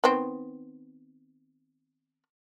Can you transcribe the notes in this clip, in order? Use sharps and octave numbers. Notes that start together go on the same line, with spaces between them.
D#3 B3 C4